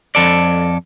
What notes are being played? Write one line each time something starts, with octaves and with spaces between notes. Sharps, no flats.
F2 A4 D5